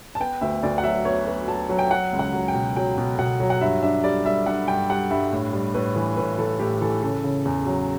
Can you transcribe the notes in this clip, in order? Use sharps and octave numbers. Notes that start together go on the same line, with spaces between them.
A5
B3 G5
D2 E5
D2 D5
F#5
F#3 E5
B3 C#5
B3
F#3 A5
F#3
G5
F#3 F#5
C#2
F#5
F#3
G5
B2
F#3 G5
B2
B2 F#5
F#3
F#5
G2 E5
D4 E5
G3 D5
G3 E5
D4 F#5
G2 G5
G3 F#5
G2 E5
A2
G3
A2 B4
E3
A2 B4
E3 A4
A2 G4
E3 A4
C#3 A4
C#3
E2
F#3